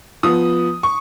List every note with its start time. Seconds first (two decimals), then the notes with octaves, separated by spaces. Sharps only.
0.23 F3 B3 D#6
0.83 C#6